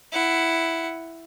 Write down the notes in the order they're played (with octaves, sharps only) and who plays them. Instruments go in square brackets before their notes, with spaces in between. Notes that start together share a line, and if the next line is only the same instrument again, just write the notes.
[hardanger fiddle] E4 F#5